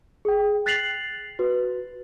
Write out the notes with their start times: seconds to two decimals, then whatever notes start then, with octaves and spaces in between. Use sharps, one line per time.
0.25 G#4 G5
0.66 F#6 A6 B6 C7 F7 F#7
1.39 F#4 B4